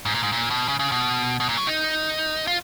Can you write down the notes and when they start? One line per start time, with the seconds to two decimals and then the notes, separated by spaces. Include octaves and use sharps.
0.05 G#2
0.15 A#2
0.23 G#2
0.32 A#2
0.50 B2
0.68 C#3
0.79 C#3
0.92 B2
1.40 B2
1.49 A#2
1.57 F#3
1.67 D#4
2.47 F4